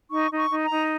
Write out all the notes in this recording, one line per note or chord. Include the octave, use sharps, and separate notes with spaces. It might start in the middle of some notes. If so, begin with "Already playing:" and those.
D#4 C#6
D#4
C#6
D#4
A#5
D#4